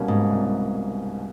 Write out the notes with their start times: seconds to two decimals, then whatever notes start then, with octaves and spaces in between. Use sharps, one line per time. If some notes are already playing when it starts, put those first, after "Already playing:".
Already playing: C2 B2 G3 A#3 C#4
0.08 G#2
0.31 C2